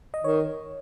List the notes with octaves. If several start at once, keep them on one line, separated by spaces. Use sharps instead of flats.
D#5
D#3 C#5